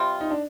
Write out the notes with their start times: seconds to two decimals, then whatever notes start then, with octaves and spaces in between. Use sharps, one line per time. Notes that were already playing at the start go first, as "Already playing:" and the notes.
Already playing: C3 G3 C4 F4
0.21 D#4
0.31 D4